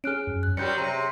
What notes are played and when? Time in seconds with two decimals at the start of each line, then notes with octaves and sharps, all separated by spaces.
0.04 C#4 G#4 F6 F#6 D7
0.27 F#2
0.43 F#6
0.57 F#2 F#3 G3 C#5 G6 C#7
0.78 C3 A#5 D#7